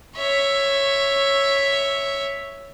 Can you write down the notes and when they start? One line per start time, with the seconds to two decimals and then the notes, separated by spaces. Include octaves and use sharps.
0.17 C#5 E5